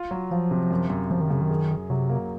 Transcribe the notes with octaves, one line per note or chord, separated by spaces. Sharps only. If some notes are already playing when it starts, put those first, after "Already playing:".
Already playing: F4
F#3
F3 F4
C3
F#2
F#2
F#2 F3
D#3
F#2 C#3
D#3
G#4
G#4
C3 F#3
A#3